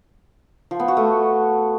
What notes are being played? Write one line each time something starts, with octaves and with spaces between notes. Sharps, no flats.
F3
B3
F#4
A3